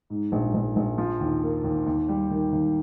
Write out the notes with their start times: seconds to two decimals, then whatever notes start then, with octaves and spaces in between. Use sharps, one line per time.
0.10 G#2
0.32 A#1
0.54 A#1
0.76 A#1
0.98 F3
1.20 D#2
1.42 A#3
1.64 D#2
1.86 D#2
2.08 G3
2.31 D#3
2.52 D#2